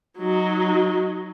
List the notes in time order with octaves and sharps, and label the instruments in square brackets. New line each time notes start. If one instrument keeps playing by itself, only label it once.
[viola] F#3 D#4